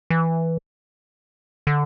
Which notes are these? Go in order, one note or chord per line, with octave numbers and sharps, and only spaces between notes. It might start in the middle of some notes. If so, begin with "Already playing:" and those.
E3
D3